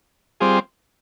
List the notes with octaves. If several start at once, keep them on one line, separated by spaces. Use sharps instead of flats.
G3 C4 F4 G#4 C5